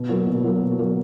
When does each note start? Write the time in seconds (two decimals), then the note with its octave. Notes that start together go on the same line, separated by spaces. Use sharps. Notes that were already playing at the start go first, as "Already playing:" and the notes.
Already playing: B2
0.09 F#3 A#3
0.27 B2
0.44 F#3 A#3
0.62 B2
0.79 F#3 A#3